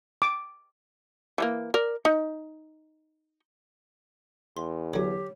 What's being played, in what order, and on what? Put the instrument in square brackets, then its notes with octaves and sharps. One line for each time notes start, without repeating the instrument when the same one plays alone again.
[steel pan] D6
[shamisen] E3 G#3 A#3
A#4 D5
D#4
[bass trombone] E2 [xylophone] C6
[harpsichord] D3 F#3 [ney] G4 [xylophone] C#5